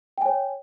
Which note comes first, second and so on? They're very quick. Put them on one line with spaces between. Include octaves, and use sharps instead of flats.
G5 G#5 C#5